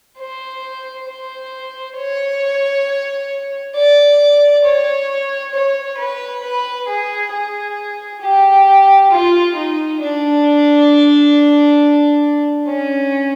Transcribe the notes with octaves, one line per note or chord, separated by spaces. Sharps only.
C5
C5
C#5
D5
C#5
C#5
B4
B4
G#4
G#4
G4
F4
D#4
D4
C#4